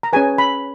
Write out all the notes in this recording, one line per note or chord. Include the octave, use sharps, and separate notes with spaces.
A#5
C#4 G#4 B4 G#5
B5